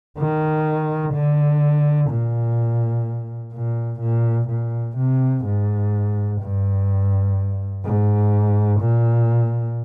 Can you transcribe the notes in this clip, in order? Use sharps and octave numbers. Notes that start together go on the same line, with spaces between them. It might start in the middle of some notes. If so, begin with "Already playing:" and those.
D#3
D3
A#2
A#2
A#2
A#2
C3
G#2
G2
G#2
A#2